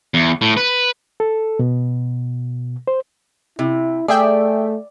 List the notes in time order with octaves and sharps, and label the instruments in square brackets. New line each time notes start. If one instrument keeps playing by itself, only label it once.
[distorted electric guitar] E2
A2
B4
[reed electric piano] A4
B2
C5
[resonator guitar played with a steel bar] C3 [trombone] E4
[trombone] A3 [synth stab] G#4 E5 G5 [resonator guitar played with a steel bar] D5